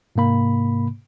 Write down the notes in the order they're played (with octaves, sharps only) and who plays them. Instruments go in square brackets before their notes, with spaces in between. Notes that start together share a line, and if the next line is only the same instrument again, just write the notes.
[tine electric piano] G#2 C3 A#3 B5